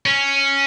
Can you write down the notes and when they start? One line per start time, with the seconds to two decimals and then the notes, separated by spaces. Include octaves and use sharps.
0.06 C#4